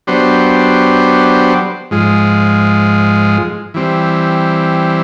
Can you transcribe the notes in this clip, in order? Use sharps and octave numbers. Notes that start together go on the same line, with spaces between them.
F#3 B3 D4 G4 C5
G#2 F3 G#3
E3 G3 C4